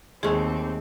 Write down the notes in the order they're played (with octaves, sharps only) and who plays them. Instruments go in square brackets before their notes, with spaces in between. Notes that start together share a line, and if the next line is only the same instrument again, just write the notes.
[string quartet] D#2 C4 [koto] G#3 A3 [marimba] G#4